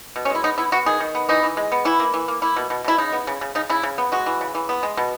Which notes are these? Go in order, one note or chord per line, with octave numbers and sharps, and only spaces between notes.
B2
C#4
G#3 E4
B3 D#4
B3 E4
B3 F#4
D#3 G#4
D#3
B3
E3 D#4
E3
G#3
B3
E3 E4
A#3
E3
A#3
A#3 E4
B2
B2
B2 E4
C#3 D#4
B3
C#3
C#3
C#3 D#4
C#3 E4
C#3
B3
G#3 F#4
E3
C#3
E3
B3
G#3
B2